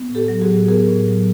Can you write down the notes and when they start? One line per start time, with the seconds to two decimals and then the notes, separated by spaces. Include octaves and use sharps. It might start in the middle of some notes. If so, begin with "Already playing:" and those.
Already playing: B3
0.09 A2
0.15 G4 A4
0.28 F#3
0.41 F#4 G#4
0.48 A2
0.68 B3 G#4 A#4
0.88 A2
1.08 F#3